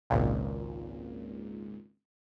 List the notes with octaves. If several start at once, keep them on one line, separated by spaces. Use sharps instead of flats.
G#1 C#2 A#2